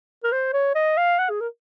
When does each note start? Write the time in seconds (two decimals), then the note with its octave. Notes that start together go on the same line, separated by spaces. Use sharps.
0.24 A#4
0.32 C5
0.53 C#5
0.75 D#5
0.97 F5
1.19 F#5
1.30 G#4
1.41 A#4